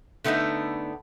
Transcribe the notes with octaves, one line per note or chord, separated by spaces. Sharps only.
D3 A3 B3 D4 D#4